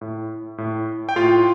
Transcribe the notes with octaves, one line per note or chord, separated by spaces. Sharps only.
A2
A2
G5
A2 F4 F5